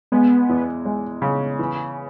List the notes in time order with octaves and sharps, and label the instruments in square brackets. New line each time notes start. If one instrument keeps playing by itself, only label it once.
[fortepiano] G#3 [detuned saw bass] B3
[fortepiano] E2
G#3
C#3
E3